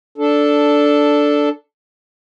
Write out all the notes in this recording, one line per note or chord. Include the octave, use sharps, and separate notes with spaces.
D4 A4